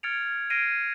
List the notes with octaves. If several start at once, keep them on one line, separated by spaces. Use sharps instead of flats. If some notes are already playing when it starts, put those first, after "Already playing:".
F6 G#6 A6 C#7 D7 F7
F6 G#6 A#6 C7 D7 D#7